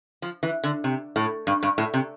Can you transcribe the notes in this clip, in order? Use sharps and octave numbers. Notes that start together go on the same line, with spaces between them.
F3
E3
D3
C3
A2
G2
G2
A2
C3